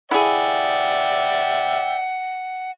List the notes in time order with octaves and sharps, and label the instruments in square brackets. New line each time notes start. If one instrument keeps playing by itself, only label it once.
[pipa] E4 G#4 [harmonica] D5 E5 G5 [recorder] F#5